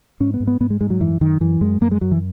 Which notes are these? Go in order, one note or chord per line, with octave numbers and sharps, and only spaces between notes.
G#2 C#4
B3
G#2
B3
G#2 B3
G#3
G#2 G#3
F#3
F#2 E3
F#2 D#3
F#2 E3
F#2 G#3
F#2 A#3
G#3
F#2 F#3
E3